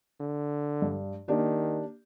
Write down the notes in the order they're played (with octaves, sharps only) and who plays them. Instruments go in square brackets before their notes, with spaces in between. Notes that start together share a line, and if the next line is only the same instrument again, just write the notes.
[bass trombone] D3
[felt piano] G2
[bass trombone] D#3 [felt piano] A#3 D4 G4